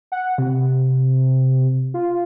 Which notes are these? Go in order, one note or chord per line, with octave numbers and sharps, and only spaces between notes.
F#5
C3
F4